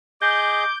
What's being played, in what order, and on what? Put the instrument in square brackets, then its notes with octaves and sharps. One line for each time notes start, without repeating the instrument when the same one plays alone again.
[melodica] G#4 D#5 [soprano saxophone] D6 [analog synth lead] G6